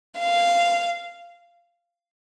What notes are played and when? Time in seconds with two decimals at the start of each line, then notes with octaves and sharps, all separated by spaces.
0.19 F5